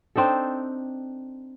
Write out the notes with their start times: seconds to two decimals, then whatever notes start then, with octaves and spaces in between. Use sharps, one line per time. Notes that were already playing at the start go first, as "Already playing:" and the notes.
0.16 C4 D4 D#4 A4